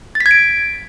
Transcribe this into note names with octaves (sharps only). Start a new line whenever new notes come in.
A6
B6
G#6
D7